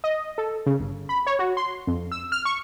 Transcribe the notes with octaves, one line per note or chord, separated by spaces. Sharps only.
D#5
A4
C#3
G1
B5
C#5
F#4
C6
F2
E6
F6
C#6